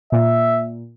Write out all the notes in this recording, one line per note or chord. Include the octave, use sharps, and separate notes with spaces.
A#2 E5